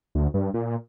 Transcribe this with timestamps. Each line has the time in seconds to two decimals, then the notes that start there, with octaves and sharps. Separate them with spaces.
0.15 D2
0.34 G2
0.54 A#2